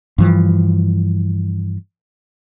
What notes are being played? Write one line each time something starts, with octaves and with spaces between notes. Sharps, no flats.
G2 E3 F3